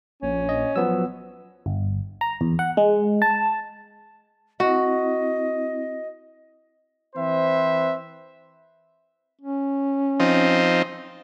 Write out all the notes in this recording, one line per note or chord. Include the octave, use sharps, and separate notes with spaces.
A#1 C#4
D#5
F3 F#3 B3 E6
G1
A#5
E2
F#5
G#3
A5
C4 E4 F#4 D#5
E3 C4 B4 C5 E5
C#4
F3 C4 D#4